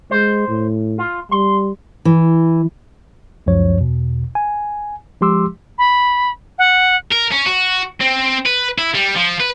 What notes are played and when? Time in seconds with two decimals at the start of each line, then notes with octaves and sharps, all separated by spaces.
0.11 G#3 C5
0.48 A2
0.98 F4
1.31 G3 C6
2.05 E3
3.46 C#2 F#2 F3 C#5
3.78 E2 B2
4.35 G#5
5.21 F3 G#3 G4 C6 D6 E6
5.78 B5
6.58 F#5
7.12 A#4
7.32 C#4
7.46 F#4
8.01 C4
8.46 B4
8.78 E4
8.95 G3
9.16 F3
9.40 B4